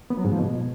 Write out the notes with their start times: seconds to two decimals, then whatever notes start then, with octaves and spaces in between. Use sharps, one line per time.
0.10 B3
0.17 F#3
0.25 G#2
0.32 F3
0.39 B2